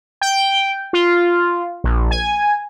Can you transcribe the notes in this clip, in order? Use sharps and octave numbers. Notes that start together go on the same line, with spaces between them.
G5
F4
A#1
G#5